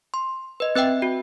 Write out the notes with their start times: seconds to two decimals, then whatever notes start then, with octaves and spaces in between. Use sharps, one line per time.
0.14 C6
0.60 B4 D#5
0.75 C4 B4 E5 G5
1.02 F#4